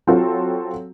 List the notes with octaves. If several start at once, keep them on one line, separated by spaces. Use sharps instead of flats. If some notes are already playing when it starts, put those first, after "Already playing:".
F#3 C4 F4 F#4 A4